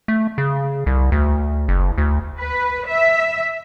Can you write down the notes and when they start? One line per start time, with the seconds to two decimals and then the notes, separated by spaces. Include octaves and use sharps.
0.08 A3
0.38 C#3
0.86 C2
1.12 D2
1.68 F#1
1.98 D2
2.40 B4
2.87 E5